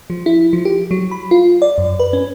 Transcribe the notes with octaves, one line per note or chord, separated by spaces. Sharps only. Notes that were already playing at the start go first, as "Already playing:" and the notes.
F3
E4
F3
G4
F#3
B5
F4
D5
F#2
B4
C#4